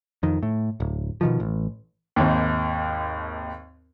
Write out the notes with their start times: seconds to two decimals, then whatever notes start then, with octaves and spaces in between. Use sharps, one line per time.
0.23 F2 D#3
0.43 A2
0.80 D1
1.21 B2 D#3 F3
1.40 A1
2.16 G#1 D#2